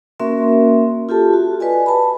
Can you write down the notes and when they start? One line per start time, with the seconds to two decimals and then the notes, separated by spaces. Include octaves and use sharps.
0.20 A#3 C#4 F#4 A#4 E5 C6
1.09 F4 G4 A4 A5
1.33 F#4
1.60 B4 D5 D#5 G#5
1.86 A5 B5